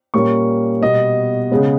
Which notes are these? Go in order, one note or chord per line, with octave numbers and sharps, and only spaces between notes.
A#2 G3 A#3 C#4 C#6
B2 G3 B3 D#5
C#3 G#3 B3